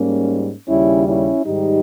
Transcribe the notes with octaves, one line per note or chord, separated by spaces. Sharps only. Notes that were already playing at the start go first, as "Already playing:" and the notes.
Already playing: G#2 G3 A#3 C#4
D#2 C#3 G3 C#4 E4
C#4 E4
G#2 D#3 G3 D#4 G4